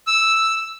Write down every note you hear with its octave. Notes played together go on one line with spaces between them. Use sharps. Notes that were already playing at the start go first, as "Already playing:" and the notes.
E6